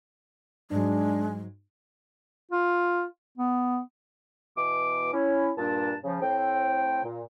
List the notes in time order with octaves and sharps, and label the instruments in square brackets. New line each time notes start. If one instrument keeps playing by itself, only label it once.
[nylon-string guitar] G#2 F#3 [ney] G#3 [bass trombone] D4
[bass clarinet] F4
B3
[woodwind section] B2 E3 D6
C#4 E4
G2 A#2 D4 A5
C#3 F3
A2 C4 G5
A#2